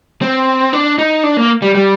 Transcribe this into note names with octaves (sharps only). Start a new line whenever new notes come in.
C4
D4
D#4
D4
A#3
G3
G3